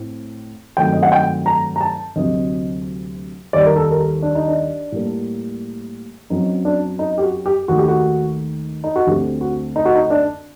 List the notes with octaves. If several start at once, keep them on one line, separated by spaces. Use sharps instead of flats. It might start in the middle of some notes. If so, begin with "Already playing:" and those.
Already playing: A2 A3 C4
G2 D#3 F#3 A3 C4 G5
D#5
F#5
G5
A#5
A#5
A5
D2 C3 F#3 C4 D#5
D#2 D#3 G3 D5
A#4
A4
A#4
A4
D4
D#4
D4
A2 G3 A#3
F#2 F#3 C4 D#4
D4
D#4
G4
F#4
G4
D#2 D#3 A3 F#4
G4
F#4
D#4
F#4
D2 D3 A3 C4 G4
F#4
D#4
F#4
D#4
D4